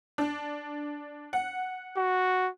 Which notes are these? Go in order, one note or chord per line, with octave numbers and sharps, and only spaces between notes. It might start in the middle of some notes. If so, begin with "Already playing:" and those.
D4
F#5
F#4